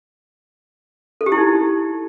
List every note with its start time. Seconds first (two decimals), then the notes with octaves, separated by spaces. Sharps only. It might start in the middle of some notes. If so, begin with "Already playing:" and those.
1.21 A4
1.26 G4
1.32 E4
1.38 D#4